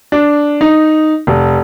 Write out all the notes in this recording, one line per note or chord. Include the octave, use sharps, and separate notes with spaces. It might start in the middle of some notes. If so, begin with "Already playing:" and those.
D4
D#4
F1